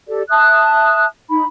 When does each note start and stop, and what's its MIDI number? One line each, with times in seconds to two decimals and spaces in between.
0.08 0.22 67
0.08 0.22 69
0.08 0.22 74
0.30 1.05 76
0.30 1.05 81
0.30 1.05 87
0.30 1.05 90
1.30 1.44 63
1.30 1.44 83